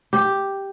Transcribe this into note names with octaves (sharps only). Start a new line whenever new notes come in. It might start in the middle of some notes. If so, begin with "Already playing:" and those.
G4